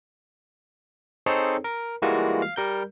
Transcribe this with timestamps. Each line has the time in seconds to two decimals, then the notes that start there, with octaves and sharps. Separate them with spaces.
1.26 C4 D#4 G#4 A4 C5 C#5
1.64 A#4
2.02 E3 G3 G#3 A#3 F4 F#4
2.42 F5
2.56 G3 A#4 G6